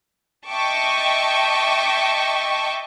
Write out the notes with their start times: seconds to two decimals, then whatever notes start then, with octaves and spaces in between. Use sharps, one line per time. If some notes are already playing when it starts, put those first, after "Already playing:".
0.47 D#5 E5 G5 A5 C#6 D6